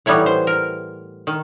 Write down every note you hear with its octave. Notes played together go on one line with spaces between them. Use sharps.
A2 E3 G3 B3 D#4 C#5
C5
A#4
D#3